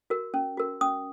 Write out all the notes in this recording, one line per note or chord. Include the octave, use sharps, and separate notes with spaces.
F#4 A#4
C#4
F#4 A#4
C#4 D#6